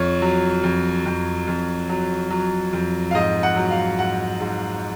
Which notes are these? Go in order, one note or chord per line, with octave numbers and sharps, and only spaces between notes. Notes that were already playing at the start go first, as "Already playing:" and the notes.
Already playing: F2 C#5
F#3
F2
F2
F2
F#3
F#3
F2
F5
G#2 D#5
F#5
F#3
F5
G#2 F#5
G#2